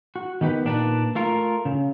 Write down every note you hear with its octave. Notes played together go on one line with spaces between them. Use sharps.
F#4
D#3 B3 G4 B4
A#2 D4 D#4 B4 D5
A3 F4 A#4
C#3